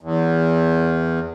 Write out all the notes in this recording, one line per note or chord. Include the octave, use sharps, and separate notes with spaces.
E2